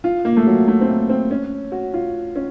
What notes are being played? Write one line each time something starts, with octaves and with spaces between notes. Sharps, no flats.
F4
A#3
A3
F#3
A3
C4
A#3
C4
C#4
F#4
F4
C#4